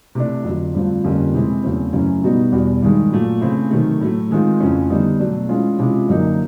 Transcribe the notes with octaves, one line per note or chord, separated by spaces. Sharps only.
C3 E3 A3 D4
F2 D3 F#3
G2 D3 F3 A3 C4
F2 D3 G3 A#3 C#4
C3 E3 G#3 C4 E4
E2 C#3 F#3 A3 C4
F#2 C#3 E3 A3 C#4
B2 G3 B3 D#4 F#4
E2 B2 G3
G2 D#3 G#3
A#2 F#3 A3
C#3 E3 A3 C4 E4
C3 D#3 F#3 A3
A2 F#3 A3
D#3 G#3 C4 F4
F2 C#3 E3 A3 C#4
D3 G3 B3 D#4
B2 F#3 A3 D4
E3 G#3 C#4 F4
C3 F3 G#3 C#4 E4
F#2 D3 F#3 A#3 D#4